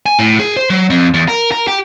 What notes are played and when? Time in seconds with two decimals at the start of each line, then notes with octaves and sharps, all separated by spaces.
0.06 G#5
0.19 A2
0.40 G#4
0.56 C5
0.70 F#3
0.90 F2
1.14 E2
1.28 A#4
1.52 A#4
1.67 G4